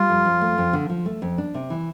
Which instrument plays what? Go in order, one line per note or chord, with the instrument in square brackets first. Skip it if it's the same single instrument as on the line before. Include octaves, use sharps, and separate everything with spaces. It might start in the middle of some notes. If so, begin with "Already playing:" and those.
Already playing: [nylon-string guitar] G3 [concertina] F4
[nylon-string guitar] F2
F2
A3
F2
D3
F3
A3
F2
D4
C3
E3